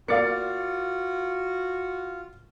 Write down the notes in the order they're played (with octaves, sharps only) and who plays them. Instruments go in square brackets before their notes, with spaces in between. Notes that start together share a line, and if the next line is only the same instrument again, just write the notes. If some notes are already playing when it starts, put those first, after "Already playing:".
[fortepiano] A#3 D5 [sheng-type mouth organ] F4 [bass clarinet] F#4 [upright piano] F5 A6 C#7